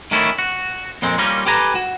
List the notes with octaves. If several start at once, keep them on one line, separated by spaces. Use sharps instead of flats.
D#3 A3 C#4 D4 E4
F#4
F2 A#2 G#3 C4
G3 A#3 C#4 D#4 F4
G4 A4 B4 G#5 A#5
F#4